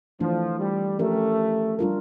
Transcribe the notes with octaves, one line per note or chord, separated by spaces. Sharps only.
E3 F3 A3 D4
G3
F3 A3 C#4 G4 A#4
G3 D4 F4 A#4